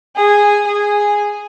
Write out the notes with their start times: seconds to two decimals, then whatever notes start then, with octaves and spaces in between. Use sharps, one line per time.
0.16 G#4
0.67 G#4